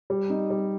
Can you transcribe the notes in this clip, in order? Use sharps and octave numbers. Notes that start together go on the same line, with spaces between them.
G3
D#4
G3